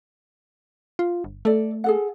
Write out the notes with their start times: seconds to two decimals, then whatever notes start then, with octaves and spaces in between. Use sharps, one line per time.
0.99 F4
1.24 G1
1.45 A3 A4 D5
1.84 G#4 A4 F#5